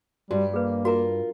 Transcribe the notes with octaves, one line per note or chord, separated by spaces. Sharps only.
G2 G3 F#4
A#3 G#4 B4
F4 F#4 A#4 A#5